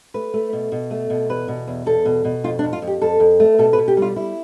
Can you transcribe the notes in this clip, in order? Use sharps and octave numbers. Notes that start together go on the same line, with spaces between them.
A3 B4
A3
B2
B2
A3
B2
E2 B4
B2
E2
E2 A4
B2
B2
F2 F4
D4
F2
F4
F2
G4
F2 A4
F2
A3
B2 A4
B4
B2
G4
G3 F4
G3 E4